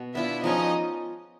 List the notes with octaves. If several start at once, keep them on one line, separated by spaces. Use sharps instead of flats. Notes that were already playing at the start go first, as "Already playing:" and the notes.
Already playing: B2
B3 D4 E4 F4 E5
F3 G#3 C#4 D#4 D#5